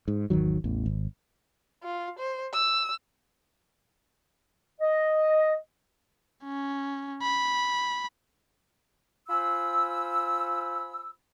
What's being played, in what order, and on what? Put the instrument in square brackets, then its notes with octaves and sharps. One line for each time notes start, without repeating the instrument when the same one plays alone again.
[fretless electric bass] G#2
G#1 E2 D#3 F#3
A1 E2
G#1
[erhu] F4
C5
E6
[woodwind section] D#5
[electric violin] C#4
B5
[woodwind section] F4 C5 G#5 B5 E6